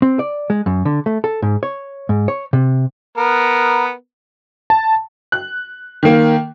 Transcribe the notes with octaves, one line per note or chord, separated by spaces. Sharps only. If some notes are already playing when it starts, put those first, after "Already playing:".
C4
D5
G#3
F#2
D3
A3
A4
G#2
C#5
G#2
C#5
C3
B3 A#4
A5
F#6
D#3 A#3